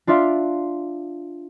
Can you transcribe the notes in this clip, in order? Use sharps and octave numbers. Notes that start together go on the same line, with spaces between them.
D4 F4 D5 E5 F5 C6